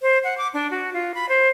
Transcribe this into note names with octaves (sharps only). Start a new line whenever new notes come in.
C5
F#5
D6
D4
F#4
F4
B5
C5